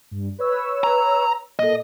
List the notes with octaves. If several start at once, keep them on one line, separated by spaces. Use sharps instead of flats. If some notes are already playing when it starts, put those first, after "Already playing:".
G2
B4 C#5 E6
A#5
A#2 A4 D#5